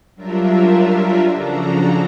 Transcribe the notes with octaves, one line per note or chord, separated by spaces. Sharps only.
F#3 G3 D4 F4 A#4 E5
C#3 F3 D4 F#4 A4 A#5